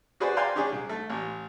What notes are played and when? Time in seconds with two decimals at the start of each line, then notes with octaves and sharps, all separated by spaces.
0.20 F#4 G#4 B4 C5 D5
0.37 D5 F5 G5 G#5 A#5 C6
0.55 C#4 D4 G4 G#4
0.72 C2
0.89 A3
1.10 A1